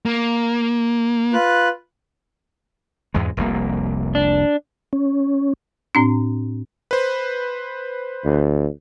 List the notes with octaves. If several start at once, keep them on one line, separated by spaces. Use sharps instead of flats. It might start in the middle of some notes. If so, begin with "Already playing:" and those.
A#3
F4 B4 F#6
E2 G#2 G#3
F1 C2 A#3
D4
C#4
A2 C4 D4
B4 C5
D2